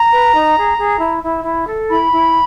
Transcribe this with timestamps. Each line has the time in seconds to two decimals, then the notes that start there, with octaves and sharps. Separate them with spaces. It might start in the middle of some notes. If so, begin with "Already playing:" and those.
Already playing: A#5
0.13 B4
0.34 D#4
0.57 G#4
0.79 G#4
1.01 E4
1.23 E4
1.45 E4
1.68 A4
1.89 E4 B5
2.12 E4